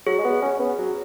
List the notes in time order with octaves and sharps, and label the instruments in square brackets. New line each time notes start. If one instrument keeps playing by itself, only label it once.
[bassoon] F#3 [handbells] G#4
[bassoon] G#3
B3
C#4
B3
F#3